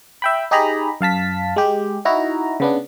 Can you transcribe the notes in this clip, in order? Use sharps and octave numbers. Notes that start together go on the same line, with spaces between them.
E5 G5 B5
D#4 G4 G#4 D#5 A#5 B5
F#2 F5 A5 B6
G#3 G4
D#4 E4 F#4 A#5
C#3 B3 D4